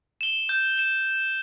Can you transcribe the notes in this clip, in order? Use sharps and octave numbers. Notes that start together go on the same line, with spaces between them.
E7 G7
G6
E7 G7